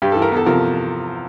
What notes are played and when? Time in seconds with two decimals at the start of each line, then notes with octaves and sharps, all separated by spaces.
0.02 G2 G4
0.12 E3 A4
0.22 A#4
0.32 E2 A4
0.46 C3 F3 A#4